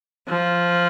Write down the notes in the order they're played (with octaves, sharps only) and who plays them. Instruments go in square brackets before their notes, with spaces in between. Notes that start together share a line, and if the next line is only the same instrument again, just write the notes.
[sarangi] F3